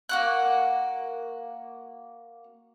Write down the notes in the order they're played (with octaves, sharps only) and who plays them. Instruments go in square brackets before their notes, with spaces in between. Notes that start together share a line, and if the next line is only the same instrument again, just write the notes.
[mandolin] A#3 F#4 F#6